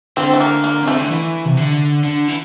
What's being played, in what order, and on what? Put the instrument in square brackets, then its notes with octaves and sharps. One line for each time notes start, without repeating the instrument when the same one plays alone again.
[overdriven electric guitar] D3 [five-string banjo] C4
[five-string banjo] A3
A#3
A#3
[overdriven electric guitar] C3 [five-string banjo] A3
[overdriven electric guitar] D3
E3
C3
D3
D3
E3